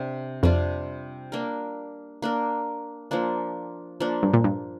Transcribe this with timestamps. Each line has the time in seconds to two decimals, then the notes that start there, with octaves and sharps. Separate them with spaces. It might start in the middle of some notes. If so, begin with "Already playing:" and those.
Already playing: C3 D4
0.43 F2 C3 G3 D4 F4
1.32 A#3 D4 A#4
2.22 A#3 D4 A#4
3.11 F3 A#3 D4
4.00 F3 A#3 D4
4.23 G2
4.34 A#2
4.44 G2